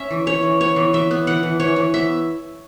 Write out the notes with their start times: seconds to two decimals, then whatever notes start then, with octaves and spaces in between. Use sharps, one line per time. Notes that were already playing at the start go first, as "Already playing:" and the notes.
Already playing: C#4 E5
0.11 E3
0.27 C#4 C#5
0.43 E3
0.60 B3 C#5
0.76 E3
0.93 E3 E5
1.11 B3
1.27 E3 F#5
1.43 E3
1.60 E3 C#5
1.76 E3
1.94 B3 E5